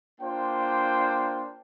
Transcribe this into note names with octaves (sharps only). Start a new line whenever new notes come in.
A#3 D4 F4 C5 G5